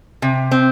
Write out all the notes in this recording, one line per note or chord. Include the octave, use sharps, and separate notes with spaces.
C3
C4